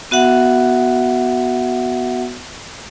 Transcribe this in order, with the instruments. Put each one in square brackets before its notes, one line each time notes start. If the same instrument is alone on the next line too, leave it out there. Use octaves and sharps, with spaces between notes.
[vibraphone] B3 F#4 E5 F#5